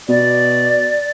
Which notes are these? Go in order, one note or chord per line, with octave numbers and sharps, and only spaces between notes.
B2 D5